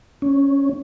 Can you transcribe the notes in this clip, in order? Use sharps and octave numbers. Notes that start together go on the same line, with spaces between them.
C#4